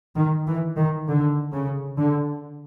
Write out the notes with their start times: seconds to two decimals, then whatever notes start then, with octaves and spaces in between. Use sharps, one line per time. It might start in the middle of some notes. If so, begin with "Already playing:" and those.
0.16 D#3
0.47 E3
0.77 D#3
1.08 D3
1.53 C#3
1.98 D3